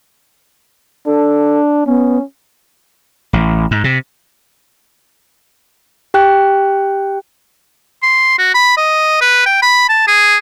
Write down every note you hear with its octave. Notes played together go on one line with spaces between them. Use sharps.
D4 A4
B3 C#4
A1
G#2
C3
G4 G5 F#6
C6
F#4
B5
D#5
B4
G5
B5
A5
G#4